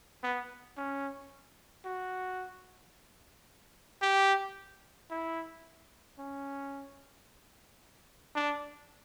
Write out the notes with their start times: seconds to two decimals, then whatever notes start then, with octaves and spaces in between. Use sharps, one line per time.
0.23 B3
0.77 C#4
1.85 F#4
4.02 G4
5.11 E4
6.19 C#4
8.36 D4